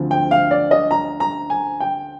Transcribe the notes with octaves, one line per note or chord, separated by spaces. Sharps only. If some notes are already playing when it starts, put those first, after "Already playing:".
Already playing: D2 D3 F3 C4
G5
F5
D5
D#5
A#5
A#5
G#5
G5